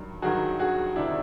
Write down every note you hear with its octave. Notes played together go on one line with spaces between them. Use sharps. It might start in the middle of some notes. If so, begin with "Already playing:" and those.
Already playing: G2 D#3 F#3
G2 D#3 F#3 F#4 G#4
F#4 G#4
C3 D#3 G3 D4 E4